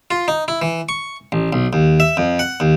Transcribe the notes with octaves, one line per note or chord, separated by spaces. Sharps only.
F4
D#4
E4
E3
C#6
A1
B1
D#2
E5
F2
F#5
D#2